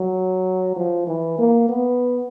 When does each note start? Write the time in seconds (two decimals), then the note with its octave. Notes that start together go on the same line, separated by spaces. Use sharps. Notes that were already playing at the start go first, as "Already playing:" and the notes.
Already playing: F#3
0.76 F3
1.07 E3
1.38 A#3
1.68 B3